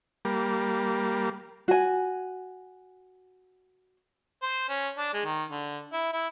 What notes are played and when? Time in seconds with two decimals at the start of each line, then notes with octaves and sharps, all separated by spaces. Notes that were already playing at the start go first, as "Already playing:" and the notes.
0.25 G3 A#3
1.68 F#4 G#5
4.42 C5
4.69 C#4
4.98 D4
5.14 G#3
5.25 D#3
5.50 D3
5.93 E4
6.13 E4